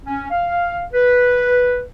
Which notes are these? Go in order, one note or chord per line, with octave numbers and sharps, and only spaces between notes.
C#4
F5
B4